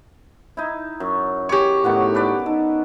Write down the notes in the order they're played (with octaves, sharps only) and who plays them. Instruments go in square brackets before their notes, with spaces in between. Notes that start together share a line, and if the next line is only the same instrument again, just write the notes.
[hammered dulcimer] D#4 E4
F#2
[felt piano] G4 C#6 [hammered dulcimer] G#4 C#5
[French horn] A2 [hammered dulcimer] D#3 B3 F#4
[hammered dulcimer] A4 B4 D5
[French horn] D#4 [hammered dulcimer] A4